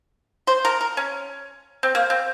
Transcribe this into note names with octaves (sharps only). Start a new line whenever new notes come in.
C5
A#4
A#4
C#4
C4
A#3
C4